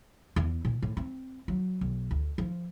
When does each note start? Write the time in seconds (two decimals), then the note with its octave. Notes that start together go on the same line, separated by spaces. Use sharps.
0.36 E2
0.65 A#2
0.82 A2
0.97 C4
1.48 F#3
1.81 B1
2.11 D2
2.38 F3